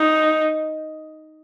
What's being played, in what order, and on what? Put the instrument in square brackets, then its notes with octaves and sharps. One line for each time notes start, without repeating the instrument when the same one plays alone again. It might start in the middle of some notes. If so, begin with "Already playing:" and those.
Already playing: [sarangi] D#4